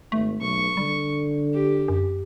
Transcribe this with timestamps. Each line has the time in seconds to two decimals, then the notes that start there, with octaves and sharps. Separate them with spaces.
0.12 G#1 A3
0.41 B1 C#6
0.77 D3 G3
1.54 G4
1.88 F#2